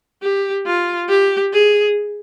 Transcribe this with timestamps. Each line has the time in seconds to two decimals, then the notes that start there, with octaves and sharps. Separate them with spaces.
0.22 G4
0.66 F4
1.09 G4
1.53 G#4